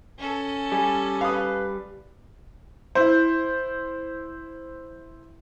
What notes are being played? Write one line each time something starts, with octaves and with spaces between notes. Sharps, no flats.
C#4 A4
G3 G#5
B4 F5 D#6
E4 C5